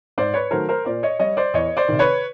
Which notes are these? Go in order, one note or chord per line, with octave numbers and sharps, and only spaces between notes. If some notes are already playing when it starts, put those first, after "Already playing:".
G#2 C5 D5
B4 C#5
D#3 F#3 A3 A#4 C5
A#4 C5
A#2 C5 D5
C#5 D#5
G3 C#5 D#5
C5 D5
E2 C#5 D#5
C5 D5
C3 D#3
B4 C#5